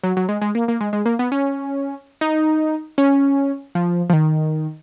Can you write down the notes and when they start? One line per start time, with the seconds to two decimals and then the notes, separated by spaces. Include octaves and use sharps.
0.03 F#3
0.17 F#3
0.29 G#3
0.42 G#3
0.55 A#3
0.68 A#3
0.81 G#3
0.93 G#3
1.06 A#3
1.19 B3
1.32 C#4
2.21 D#4
2.98 C#4
3.75 F3
4.10 F3
4.13 D#3